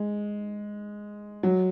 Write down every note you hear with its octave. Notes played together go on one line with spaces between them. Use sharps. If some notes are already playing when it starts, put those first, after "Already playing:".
Already playing: G#3
F#3